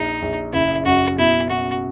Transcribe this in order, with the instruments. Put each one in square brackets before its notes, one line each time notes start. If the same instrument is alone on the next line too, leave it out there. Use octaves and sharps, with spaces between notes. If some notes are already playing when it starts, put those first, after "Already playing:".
Already playing: [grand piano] A#1 [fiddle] D#4
[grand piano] A#1
[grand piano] F#1 [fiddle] E4
[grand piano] F#2 [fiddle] F#4
[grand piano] B2 [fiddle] E4
[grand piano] B2 [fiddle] F#4